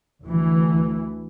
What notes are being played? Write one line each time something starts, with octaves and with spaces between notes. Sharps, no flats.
D2 E3